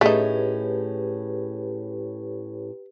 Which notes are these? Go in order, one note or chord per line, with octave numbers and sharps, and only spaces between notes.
A2 A3 C#4 D#4 G4 G#4 B4